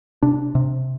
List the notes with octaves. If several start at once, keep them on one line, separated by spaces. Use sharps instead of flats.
C3 D4
C3